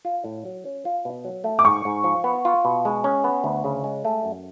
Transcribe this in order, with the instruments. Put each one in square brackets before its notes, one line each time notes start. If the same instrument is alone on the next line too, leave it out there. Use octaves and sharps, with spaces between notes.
[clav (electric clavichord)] F4
A2
F#3
C#4
F4
B2
F#3
A3
[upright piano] D6
[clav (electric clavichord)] G#2 [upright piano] C#6
[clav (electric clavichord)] G#2
F3
B3
F4
B2
G#3
C#4
B3
D2
C#3
G#3
A3
F#2